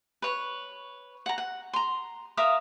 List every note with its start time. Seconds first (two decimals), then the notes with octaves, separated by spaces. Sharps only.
0.22 B4 C#5
1.26 F#5 A#5
1.38 F#5
1.73 A#5 C6
2.37 A#4 E5 F5 D#6